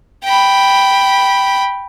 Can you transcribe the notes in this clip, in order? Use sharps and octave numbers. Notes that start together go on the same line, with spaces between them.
G5 B5